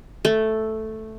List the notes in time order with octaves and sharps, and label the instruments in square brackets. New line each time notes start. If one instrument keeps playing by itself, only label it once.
[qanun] A3